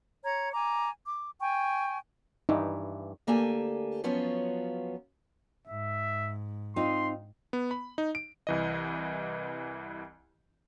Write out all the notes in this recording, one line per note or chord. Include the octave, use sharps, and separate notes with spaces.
C#5 A#5 G#6
G#5 A#5 D6
D6
G5 G#5 C#6
G2 E3 D#4
D2 A#3 G4 A4 G#5
F3 F#3 B3 C#4 F4
G#2 E5
C4 D#4 F4 C6
B3
B5
D#4
D7
C2 E3 D#5